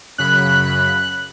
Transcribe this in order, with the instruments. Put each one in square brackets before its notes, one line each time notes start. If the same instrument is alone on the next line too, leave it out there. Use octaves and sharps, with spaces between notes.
[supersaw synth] F#2 C#3 B5 [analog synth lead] F#6